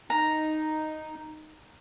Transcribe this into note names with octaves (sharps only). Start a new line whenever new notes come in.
D#4 A#5